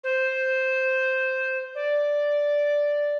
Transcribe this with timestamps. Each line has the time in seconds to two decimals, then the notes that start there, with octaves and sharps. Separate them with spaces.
0.04 C5
1.75 D5